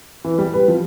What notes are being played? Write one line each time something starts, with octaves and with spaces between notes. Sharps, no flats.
E3
G3
B4
F3